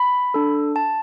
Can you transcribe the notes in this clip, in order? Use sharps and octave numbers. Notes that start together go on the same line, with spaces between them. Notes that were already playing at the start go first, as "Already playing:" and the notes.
Already playing: B5
D4 A4
A5